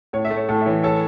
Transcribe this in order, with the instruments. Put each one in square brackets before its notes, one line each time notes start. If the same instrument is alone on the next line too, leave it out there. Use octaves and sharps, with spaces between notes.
[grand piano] A2 [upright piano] C#5
[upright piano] E5
[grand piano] A3
[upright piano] C#5
[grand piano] A2 [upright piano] A4
[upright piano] E5
[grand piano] E3 [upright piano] C#5
[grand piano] A4 [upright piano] C#5